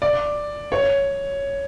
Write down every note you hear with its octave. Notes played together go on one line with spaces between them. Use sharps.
D5
C#5